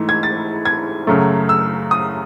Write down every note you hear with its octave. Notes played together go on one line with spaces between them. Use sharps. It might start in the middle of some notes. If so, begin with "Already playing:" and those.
Already playing: G#2 E3 A3
G#6
A6
G#6
F#2 C#3 F#3 A3
E6
D#6